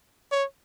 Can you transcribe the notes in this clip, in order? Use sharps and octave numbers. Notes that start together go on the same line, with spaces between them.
C#5